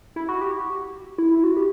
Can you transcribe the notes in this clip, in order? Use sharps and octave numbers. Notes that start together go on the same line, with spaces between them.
E4
F#4
G4
E4
E4
F#4
G4